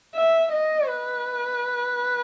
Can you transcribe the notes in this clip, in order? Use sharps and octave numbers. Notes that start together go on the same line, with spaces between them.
E5
D#5
B4